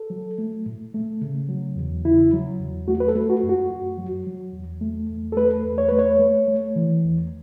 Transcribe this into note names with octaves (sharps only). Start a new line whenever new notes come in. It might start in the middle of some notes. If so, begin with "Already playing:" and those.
Already playing: A4
F#3
A3
A2
A3
C#3
F#3
E2
C#3 E4
F#3
E2
A3 F#4
B4
A4
A3
F#4
F#2
F#4
F#2
F#3
F#3
E2
A3
E2
A4
A3 B4
E2
C#5
A3 B4
C#5
A3
A3
E3
E2